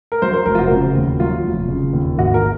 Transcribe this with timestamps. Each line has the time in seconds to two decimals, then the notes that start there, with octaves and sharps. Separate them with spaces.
0.12 A#4
0.22 F#3 C5
0.33 C5
0.46 F1 A#4
0.55 F4
0.58 F#4
0.71 C#3
0.95 D#2
1.20 F#3 F4
1.44 F1
1.68 C#3
1.93 D#2
2.17 G#1 F#4
2.34 A#4